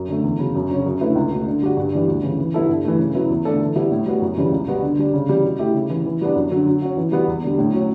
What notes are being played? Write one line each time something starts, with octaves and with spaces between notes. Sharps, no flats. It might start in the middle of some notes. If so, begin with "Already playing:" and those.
Already playing: F#2
D3 A3
E2
C#3 F#3
F#2
C#3 F#3 C#4
F#2
D3 A3 E4 B4
C#2
B2 A3
D3
G3 D4 F#4
G2
E3 G3 D4
D2
C#3 E3
E3
G3 B3 E4 A4
G2
E3 A3
C#3
F#3 B3 E4
E2
D3 A3 D4 A4
E3
G3 B3 E4
A2
G3 B3 F#4
F#2
C#3 E3 G3
C#2
B2 G3 B3 F#4
D3
G3 D4
C#3
E3 G3
B2
A3 E4 G4
C#3
E3
B3
E3
G3 B3 D4
F#2
D3 F#3
F#3
C#4 F#4
E3
G3 B3 F#4
E2
D3 G3
A2
F#3 C#4